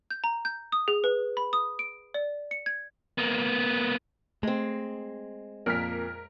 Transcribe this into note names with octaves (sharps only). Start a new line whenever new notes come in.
G6
A#5
G6
D#6
G#4
B4
B5
D#6
D7
D5
C#7
G#6
A#3 B3
G#3 A3 C4
F2 A#2 A#4 F6 B6